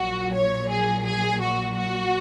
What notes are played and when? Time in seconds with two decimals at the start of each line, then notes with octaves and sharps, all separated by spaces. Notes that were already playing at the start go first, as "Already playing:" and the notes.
Already playing: A#1 A#2 F#3 F#4
0.33 C#5
0.70 G#4
1.06 G#4
1.41 F#4
1.77 F#4